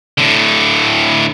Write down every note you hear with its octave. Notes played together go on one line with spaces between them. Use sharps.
A2 D3